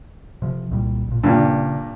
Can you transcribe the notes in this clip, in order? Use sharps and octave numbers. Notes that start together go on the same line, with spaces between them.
C3 F3
C2 A#2 G3
A#1 A#2
G2 A#2 C#3